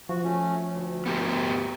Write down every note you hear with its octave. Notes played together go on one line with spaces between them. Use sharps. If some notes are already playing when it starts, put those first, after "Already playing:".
F3 F#4
A3 C#4
D2
B3 G4 A#4